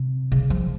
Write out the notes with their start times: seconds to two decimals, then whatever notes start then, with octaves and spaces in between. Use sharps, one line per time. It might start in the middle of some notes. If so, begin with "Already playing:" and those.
Already playing: C3
0.32 C#3
0.50 F3